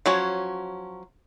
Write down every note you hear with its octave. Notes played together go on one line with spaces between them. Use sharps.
F3 F#3 C#4